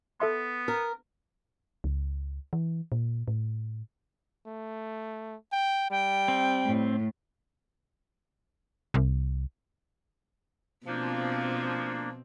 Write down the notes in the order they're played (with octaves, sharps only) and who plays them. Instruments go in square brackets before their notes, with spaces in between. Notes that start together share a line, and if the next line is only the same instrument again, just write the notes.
[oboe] B3 [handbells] A4 E5 C6
[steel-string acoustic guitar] A#4
[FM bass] C#2
E3
A#2
A2
[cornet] A3
G5
[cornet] G3 [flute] G5
[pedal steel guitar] C4
[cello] A2
[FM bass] C2
[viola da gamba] B2 C4 [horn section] F3 [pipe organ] A#3 D4